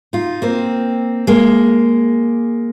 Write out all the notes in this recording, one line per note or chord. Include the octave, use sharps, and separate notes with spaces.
D#4 F4
A#3 C4
G#3 A#3